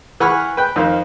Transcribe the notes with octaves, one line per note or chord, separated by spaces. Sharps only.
E3 F#5 G#5 B5 C#6 F6
B4 G5
F2 D#3 C5 F5